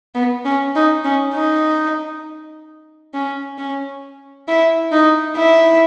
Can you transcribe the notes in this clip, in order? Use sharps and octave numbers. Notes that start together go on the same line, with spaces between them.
B3
C#4
D#4
C#4
D#4
C#4
C#4
E4
D#4
E4